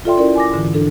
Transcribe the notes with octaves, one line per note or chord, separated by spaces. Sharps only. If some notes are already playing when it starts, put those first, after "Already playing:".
F4 A4 D5 E5 G5 C6
C#4 E4 A#4 D5
G#5 D6 A#6
G#2 D3 E3
D4 A4